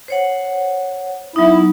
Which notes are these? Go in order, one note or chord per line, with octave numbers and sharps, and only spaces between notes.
C5 C#5 F#5
F#3 B3 D#4 E4